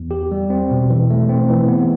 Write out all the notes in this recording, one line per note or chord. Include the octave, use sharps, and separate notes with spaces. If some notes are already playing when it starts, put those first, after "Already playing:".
Already playing: E2
G4
G3
C4
B2
E3
A3
C4
E3
B3